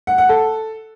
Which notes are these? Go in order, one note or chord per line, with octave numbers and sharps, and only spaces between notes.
F#5
F#5
A4